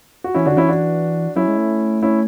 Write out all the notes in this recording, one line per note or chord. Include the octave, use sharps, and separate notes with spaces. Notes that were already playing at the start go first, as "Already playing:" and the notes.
F#4
E3 C#4 E4
D3 D4 F#4
E3 C#4 E4
D4 F#4
F#3 C#4 E4
G#3
A3
C#4 E4